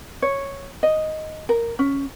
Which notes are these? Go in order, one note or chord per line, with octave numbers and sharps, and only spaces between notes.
C#5
D#5
A#4
C#4